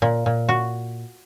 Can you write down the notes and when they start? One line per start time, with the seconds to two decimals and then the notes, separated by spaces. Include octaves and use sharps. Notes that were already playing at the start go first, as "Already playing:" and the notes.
0.02 A#2
0.26 A#2
0.49 F#4